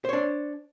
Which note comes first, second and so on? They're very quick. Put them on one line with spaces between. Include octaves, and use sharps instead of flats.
C5 C#5 D4